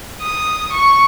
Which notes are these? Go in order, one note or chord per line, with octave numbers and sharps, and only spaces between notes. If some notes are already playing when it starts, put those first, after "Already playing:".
D#6
C#6